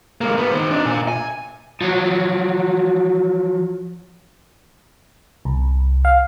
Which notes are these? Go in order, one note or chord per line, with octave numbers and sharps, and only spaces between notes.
G#3 A#3
G#2 B3
D#3 C5
D4 D#4
A#2 G#5
G#5
F3 F#3
C2
F5